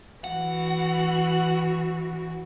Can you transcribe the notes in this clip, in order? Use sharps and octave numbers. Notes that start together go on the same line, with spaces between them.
E3 F#4 F#5